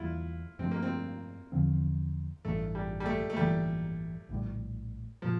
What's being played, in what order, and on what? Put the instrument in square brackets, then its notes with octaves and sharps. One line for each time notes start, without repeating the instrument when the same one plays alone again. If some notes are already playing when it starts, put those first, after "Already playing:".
Already playing: [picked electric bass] E2 E3 G3 A#3 [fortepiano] E4 F4
[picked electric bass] G2 F3 A3 D4 [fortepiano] C4
[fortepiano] A#3
C4
[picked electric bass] E2 D3 F3 C4
[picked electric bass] A1 G2 E3 [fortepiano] A3
[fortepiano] G3
G3
A3
A3
[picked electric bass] A1 G2 E3 A#3 [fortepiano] G3
[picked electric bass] A#1 A2 G3
[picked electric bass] A#2 [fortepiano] F3